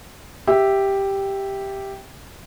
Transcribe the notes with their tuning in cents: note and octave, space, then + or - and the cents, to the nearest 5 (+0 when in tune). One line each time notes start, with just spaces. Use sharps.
G4 +0 E5 +0